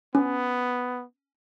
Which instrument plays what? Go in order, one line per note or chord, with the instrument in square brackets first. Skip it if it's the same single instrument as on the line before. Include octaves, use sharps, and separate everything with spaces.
[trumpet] B3 [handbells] C#4